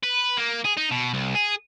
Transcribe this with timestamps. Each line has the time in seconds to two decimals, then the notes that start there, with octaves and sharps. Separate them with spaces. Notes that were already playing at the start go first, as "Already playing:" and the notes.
0.03 B4
0.38 A#3
0.65 G#4
0.77 D#4
0.91 B2
1.14 C2
1.35 G#4